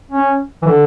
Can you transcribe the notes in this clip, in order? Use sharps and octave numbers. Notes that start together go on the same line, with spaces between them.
C#4
E3
D3